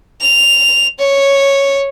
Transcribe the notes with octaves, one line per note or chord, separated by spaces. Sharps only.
F7
C#5